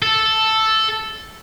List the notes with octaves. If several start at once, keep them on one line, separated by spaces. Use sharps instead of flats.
A4